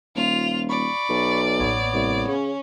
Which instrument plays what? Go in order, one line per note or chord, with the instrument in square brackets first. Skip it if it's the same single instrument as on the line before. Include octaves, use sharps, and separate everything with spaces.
[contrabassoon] D#1 [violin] F4 F7
[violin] D5 [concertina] B5 C#6
[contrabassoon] B1
[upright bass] A1 A#3 [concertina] B3 C#5
[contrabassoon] C2
[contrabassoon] C#3 [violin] C#4